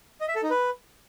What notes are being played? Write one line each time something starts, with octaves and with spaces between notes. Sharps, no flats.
D#5
E5
A4
D#4
B4